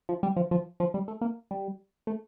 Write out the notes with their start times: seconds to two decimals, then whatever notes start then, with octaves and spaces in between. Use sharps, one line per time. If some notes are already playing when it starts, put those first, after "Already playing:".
0.09 F3
0.23 G3
0.36 F3
0.51 F3
0.80 F3
0.94 G3
1.08 A3
1.21 A#3
1.51 G3
2.07 A3